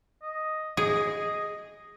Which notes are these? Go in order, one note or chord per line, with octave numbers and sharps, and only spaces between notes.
D#5
G#4 D#5